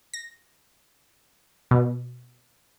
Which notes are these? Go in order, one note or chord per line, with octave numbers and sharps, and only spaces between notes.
A#6
B2